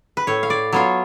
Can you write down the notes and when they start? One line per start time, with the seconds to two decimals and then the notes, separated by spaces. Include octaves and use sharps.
0.17 B4
0.27 A2 C#5
0.43 F5
0.50 D5
0.73 F#3 B3 F4 C#5